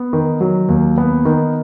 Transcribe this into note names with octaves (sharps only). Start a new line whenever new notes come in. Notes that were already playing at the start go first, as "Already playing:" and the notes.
Already playing: B3
D#3
F#3
D#2
B3
D#3